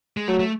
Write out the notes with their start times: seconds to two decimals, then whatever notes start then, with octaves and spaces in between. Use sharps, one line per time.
0.17 G#3
0.28 F#3 A3
0.40 A3